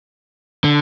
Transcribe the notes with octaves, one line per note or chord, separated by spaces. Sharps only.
D3